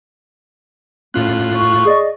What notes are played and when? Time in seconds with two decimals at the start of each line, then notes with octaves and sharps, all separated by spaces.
1.14 A2 C#4 F4 F#6
1.54 C#6
1.85 G#4 D5 D#5